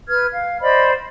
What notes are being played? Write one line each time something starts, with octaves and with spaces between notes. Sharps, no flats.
B4 F6 G#6
F5
C5 D5 D#5 B5